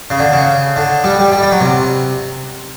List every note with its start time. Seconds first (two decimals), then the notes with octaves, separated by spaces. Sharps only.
0.10 C#3
0.19 D3
0.33 C#3
0.76 D3
1.04 G3
1.19 G3
1.32 G3
1.43 G3
1.51 F#3
1.61 C3